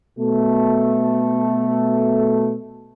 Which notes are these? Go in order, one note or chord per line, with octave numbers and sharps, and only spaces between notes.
B2 A3